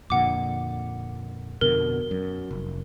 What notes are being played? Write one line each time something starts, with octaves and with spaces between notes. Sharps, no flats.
F2 A#2 D3 F#5 D6
F2 B2 D3 A#4
F#2
F1